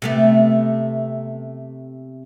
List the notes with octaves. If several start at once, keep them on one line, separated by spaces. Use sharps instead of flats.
C3 A3 B3